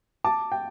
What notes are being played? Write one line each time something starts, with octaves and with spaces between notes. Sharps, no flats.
A5 D6
G5